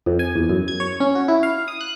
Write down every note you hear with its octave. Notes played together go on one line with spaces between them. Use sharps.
F2
G#5
E2
F#2
G#6
C#5
C#4
F#4
E4
F5
D#6
F#6